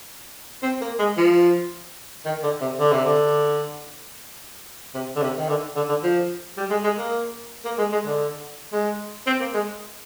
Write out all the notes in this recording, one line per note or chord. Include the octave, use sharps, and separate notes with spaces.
C4
A#3
G#3
F3
D#3
D3
C3
D3
C3
D3
C3
D3
C3
D#3
D3
D3
D3
F3
G3
G#3
G#3
A#3
A#3
G#3
G#3
D3
G#3
C4
A#3
G#3